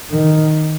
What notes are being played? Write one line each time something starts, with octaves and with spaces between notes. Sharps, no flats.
D#3